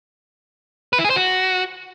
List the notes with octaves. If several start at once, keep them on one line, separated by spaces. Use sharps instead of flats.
B4
E4
G#4
C5
F#4